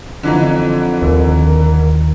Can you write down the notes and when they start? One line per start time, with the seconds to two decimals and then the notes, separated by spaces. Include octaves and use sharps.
0.23 F2 D3 E3 D#4
1.02 D#2 A#4